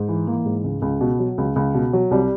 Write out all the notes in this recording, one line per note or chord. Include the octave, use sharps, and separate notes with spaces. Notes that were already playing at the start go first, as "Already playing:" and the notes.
Already playing: G#2
E3
E3 A#3
G#2
C#2
C#2
B2
F#3
C#2
C#2
B2
F#3
C2 G3